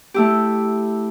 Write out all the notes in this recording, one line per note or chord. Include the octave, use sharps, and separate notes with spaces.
A3 E4 G4